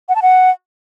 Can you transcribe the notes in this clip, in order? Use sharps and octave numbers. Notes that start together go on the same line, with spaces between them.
F#5
A5
F#5